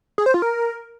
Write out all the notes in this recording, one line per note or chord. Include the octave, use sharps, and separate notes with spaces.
G#4
C5
F4
A#4